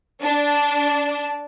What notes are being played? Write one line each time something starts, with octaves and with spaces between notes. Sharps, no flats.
D4